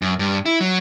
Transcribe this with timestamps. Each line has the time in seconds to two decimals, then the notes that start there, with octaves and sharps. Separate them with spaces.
0.02 F#2
0.19 G2
0.46 E4
0.60 F#3